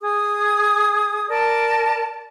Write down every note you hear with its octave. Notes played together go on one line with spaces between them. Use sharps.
G#4 D#6
A#4 D5 A5